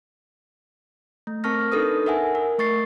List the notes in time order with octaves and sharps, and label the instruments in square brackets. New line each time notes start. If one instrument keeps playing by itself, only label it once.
[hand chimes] A3
C4 A#4 A5 C#6 F6 A#6
D4 D#4 A4 B4 D#6
A#4 E5 F#5 G#5
A#4
A3 C#6 A6 C7